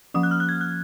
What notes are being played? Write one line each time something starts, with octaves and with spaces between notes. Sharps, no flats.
F3 A#3 C#4 D#6
F#6
F6
F#6
G#6
F#6